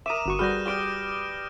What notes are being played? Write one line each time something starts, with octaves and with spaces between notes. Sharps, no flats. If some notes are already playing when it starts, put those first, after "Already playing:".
A#4 E5 A#5 D6 D#6 D#7 E7
G1 F#4 C#6
G3 F#4 G#4 B4 F6 G6 A#6
G4 D5 D6 F6 D7 G7